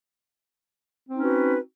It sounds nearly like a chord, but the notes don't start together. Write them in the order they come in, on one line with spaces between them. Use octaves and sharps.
C4 D#4 C#4 B4 F#4